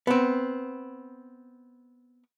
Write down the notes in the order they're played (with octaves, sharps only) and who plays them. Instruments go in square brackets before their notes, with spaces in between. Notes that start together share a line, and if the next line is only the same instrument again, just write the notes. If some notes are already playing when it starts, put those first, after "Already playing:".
[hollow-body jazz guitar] B3 C4